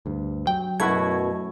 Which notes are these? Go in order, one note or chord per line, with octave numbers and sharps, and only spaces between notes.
D2 G2
F#3 G5
F#2 B2 A3 E4 F#4 G#6